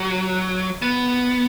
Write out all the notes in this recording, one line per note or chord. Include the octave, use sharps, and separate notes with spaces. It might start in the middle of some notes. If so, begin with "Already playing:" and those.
Already playing: F#3
B3